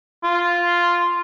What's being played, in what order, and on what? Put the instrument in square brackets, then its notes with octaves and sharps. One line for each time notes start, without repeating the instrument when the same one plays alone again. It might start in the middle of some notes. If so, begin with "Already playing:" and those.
[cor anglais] F4